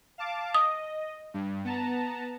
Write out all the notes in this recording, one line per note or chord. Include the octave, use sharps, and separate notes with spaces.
F5 A5 D6
D#5 D#6
G2
B3 A5 A#5